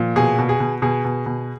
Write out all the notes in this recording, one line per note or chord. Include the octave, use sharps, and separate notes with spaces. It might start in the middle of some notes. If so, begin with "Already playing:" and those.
Already playing: A#2 F3
B2 G#4
B2
G#4
B2
B2 G#4
B2
B2